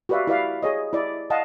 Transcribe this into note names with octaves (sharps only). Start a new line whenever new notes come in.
F#4 G4 B4 D5 E5 F5
E4 G4 B4 D5 E5 F5
G#4 C#5 D#5
E4 D5
D#5 F5 F#5 A5